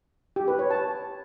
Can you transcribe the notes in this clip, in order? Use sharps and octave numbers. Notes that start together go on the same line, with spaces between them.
G4
B4
C#5
A5